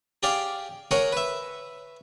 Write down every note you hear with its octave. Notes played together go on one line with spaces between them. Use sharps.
G4 G#4 D5 F5 G5
G#4 A#4 C#5 D#5 F#5
B4 E5